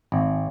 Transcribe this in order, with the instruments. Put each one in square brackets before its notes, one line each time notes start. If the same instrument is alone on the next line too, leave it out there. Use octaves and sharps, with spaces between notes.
[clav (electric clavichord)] G#1